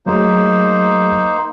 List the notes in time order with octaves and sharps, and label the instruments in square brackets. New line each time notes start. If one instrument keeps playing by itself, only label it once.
[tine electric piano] F#3 A3 G#4 [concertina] A#3 D#4 C5